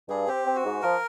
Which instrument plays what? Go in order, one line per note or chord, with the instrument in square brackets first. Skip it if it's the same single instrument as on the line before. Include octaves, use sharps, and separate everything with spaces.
[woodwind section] G2 [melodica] G#4
[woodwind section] C4 [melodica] G4
[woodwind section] C4
[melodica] F#4
[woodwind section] G#2
[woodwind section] F3 [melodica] A#4